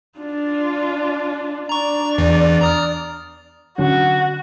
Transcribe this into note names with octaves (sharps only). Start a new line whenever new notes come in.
D4 F4
D4 D5 A#5 C#6
E2 E3
A#5 D#6 F6
D3 F#3 C#4 F#4